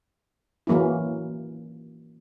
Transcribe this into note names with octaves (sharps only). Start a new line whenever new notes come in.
E3 F#3 A#3 C#4 E4